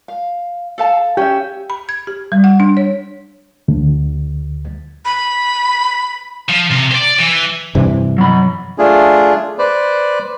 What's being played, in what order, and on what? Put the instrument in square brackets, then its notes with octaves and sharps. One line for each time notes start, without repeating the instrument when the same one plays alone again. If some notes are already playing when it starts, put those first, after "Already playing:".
[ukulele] F5
A4 F5 A5
[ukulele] C#4 E5 [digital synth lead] G4
[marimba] B5
G#6
G4
G3
F#5
D4
C#5
[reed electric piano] D2
[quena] B5
[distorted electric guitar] F3
C3
C5 D5
E3
[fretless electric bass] G2 C3 E3
[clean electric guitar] F#3 B5
[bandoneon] A3 D4 F4 G#4
B4 C5 D5